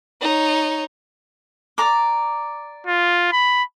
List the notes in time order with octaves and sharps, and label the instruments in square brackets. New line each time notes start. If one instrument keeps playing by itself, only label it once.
[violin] D#4 C#5
[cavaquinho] D5 A#5 D6
[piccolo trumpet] F4
B5